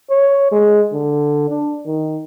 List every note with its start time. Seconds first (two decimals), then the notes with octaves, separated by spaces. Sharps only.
0.10 C#5
0.52 G#3
0.93 D3
1.50 D4
1.86 D#3